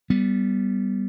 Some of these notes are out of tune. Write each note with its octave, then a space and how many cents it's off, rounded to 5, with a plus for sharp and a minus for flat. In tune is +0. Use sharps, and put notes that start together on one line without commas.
G3 +0 B3 +0